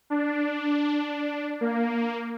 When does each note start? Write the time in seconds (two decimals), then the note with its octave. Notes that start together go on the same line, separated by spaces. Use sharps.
0.10 D4
1.61 A#3